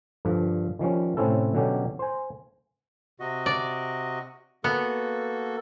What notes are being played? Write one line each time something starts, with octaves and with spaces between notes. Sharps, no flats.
G2 D3 F3
D#3 F3 G3 C#4
A2 C3 C4 C#4 E4 A4
B2 D3 F#3 C#4 G4
C5 G#5
C3 F#4 D#5
D5
A#3 B3 F#4 A4